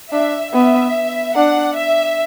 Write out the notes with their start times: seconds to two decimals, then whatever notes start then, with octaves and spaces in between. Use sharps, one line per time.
0.12 D4 E5
0.54 B3 E5
1.36 D4 F#5
1.77 E5